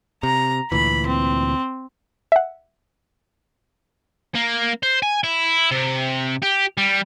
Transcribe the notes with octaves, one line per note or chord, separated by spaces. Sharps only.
C3 A#5
D2 A#2 E3 B5
C4
E5 F#5
A#3
C5
G#5
E4
C3
G4
G3